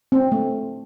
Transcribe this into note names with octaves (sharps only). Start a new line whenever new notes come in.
C4
A3